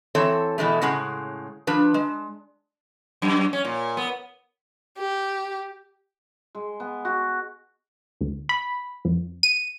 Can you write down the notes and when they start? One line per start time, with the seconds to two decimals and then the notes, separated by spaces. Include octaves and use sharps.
0.15 E3 C4 A4 C#5
0.58 B2 E3 G#3 A3
0.82 A2 C#3 G#3 F#5
1.67 F3 D4 B4
1.94 G#3
3.22 F#2
3.53 C#4
3.65 A#2
3.97 B3
4.98 G4
6.55 G#3
6.80 B3
7.05 F#4
8.21 D2
8.49 B5
9.05 F2
9.43 D#7